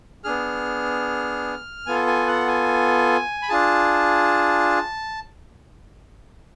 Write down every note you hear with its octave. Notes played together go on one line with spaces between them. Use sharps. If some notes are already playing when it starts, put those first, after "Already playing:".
B3 D4 G#4 F6
B3 F4 A4 G#5
G#5
F#5
G#5
B5
D4 F4 G#4 A5